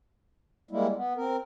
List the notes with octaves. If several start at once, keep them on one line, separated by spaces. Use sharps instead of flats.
G3 G#3 A#3 E4
B3
C4 A#4